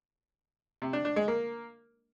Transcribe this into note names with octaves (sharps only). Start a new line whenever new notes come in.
C3
D4
D4
G#3
A#3